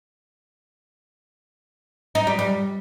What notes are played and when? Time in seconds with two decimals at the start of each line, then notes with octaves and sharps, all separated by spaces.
2.15 D#4
2.27 G3
2.39 G3